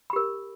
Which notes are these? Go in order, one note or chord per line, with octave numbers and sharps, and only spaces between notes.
G4 A#4 B5